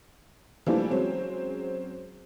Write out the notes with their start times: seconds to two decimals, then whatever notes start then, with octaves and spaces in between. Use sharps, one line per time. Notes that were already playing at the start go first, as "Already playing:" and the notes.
0.67 E3 F3 G3 A3 A#3 D4
0.91 F#3 G#3 C4 C#4